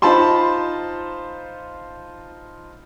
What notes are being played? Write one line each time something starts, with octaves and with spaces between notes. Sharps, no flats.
D#4 F4 C5 A5 B5 C6